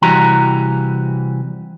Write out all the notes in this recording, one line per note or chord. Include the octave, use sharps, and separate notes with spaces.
C2 E3 F#4 G4 A#5